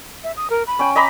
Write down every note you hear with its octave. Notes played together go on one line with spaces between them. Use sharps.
E5
D#6
A#4
B5
C#4 G5
D#5 A#5 B5 D6